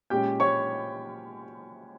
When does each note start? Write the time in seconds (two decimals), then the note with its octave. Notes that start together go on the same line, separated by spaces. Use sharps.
0.10 A#2 G#3 C#4 G4 G5
0.40 C#5 C#6